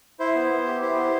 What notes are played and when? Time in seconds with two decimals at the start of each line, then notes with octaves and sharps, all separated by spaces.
0.20 E4 C5
0.35 B3
0.51 B3
0.66 G4
0.82 E4 C5
0.97 B3